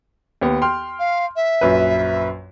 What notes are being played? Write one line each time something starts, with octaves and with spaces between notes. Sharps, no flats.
D#2 B3
G5 C6 F6
F5
E5
A#1 F#2 B4